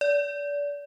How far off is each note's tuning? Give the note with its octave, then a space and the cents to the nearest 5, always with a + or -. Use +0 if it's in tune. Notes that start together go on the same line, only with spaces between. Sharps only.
D5 -30